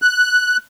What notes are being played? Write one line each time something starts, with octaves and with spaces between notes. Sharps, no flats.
F#6